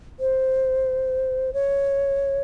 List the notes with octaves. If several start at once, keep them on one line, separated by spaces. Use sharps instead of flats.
C5
C#5